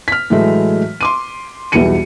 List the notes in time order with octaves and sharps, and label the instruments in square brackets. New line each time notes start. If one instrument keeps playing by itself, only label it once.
[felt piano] F6 B6
A2 E3 F#3 G#3 A3
C6 D6 D#7
B1 E2 E3 G3 C#7 D#7